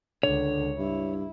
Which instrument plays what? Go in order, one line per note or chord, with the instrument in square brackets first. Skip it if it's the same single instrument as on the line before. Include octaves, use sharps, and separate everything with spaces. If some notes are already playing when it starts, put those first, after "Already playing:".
[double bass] C#2 [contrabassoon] D3 [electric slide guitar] C#5
[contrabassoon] G2 [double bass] E4